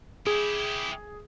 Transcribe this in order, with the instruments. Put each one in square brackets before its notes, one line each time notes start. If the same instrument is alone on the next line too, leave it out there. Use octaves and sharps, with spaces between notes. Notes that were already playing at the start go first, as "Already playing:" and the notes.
[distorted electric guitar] E4 G4 [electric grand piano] G#4